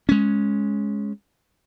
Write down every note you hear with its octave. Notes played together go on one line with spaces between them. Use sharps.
G#3 C#4